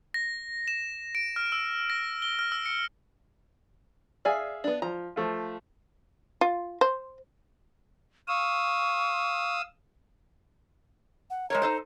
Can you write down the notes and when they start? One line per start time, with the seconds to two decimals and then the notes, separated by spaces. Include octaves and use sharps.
0.14 A#6
0.68 E7
1.15 D7
1.36 F6
1.52 E6
1.90 A#6
2.22 G7
2.39 F6
2.52 E6
2.66 C#7
4.25 G#4 D5 E5 F5 G#5
4.64 B3 D4
4.82 F3 A#5
5.16 F3 A3 F4
6.41 F4
6.81 C5
8.28 F5 C#6 D#6 E6
11.30 F#5
11.50 G#3 A#4 C#5 A#5
11.62 D#4 A4 C5